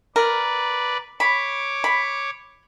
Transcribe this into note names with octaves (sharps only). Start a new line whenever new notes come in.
A#4 B4 D5
C#5 B5 D6
B5